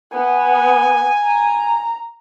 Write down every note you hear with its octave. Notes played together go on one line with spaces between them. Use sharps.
B3 G#5
A#5